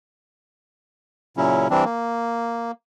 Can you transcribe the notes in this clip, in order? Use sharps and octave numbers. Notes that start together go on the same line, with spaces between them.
A#2 C#3 F#3 C#4 E4
E3 G3 C4 D4
A#3